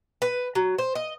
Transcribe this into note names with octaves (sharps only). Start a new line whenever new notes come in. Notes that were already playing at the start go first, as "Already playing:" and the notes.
B4
F#3
C5
D#5